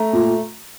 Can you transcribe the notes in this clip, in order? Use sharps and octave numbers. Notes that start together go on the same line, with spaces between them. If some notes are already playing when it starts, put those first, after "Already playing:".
Already playing: A3 A#5
A#2